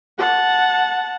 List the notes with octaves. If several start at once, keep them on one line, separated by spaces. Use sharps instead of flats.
F#5 A5